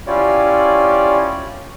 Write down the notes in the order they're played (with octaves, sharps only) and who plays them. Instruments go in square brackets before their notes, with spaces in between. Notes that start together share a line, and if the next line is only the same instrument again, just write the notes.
[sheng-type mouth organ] C#4 E4 F4 G4 C#5 D5